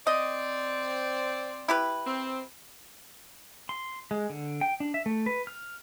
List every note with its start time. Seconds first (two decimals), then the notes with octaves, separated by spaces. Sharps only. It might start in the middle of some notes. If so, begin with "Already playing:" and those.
0.07 C4 D5 D#5
1.68 E4 G4 B4
2.06 C4
3.69 C6
4.11 G#3
4.30 D3
4.61 G5
4.80 D4
4.94 E5
5.06 A3
5.26 B4
5.47 F6